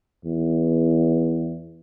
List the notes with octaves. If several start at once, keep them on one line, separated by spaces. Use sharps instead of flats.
E2